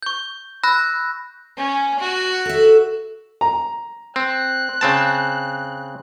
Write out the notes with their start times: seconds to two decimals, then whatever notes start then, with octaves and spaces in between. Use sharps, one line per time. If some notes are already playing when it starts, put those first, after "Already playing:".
0.02 C#6 G6
0.63 B5 E6 F#6 A#6
1.57 C#4
1.99 F#4
2.45 A4 E5
3.41 A#5
4.16 C4 F#6
4.81 C#3 C4 A5